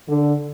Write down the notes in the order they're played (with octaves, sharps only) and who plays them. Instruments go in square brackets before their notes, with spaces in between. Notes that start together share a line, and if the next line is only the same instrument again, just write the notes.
[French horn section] D3